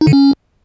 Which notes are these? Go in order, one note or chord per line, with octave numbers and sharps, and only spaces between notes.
D#4
D3
C#4